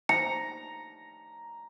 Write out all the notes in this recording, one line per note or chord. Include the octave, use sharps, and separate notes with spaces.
A#5 C#7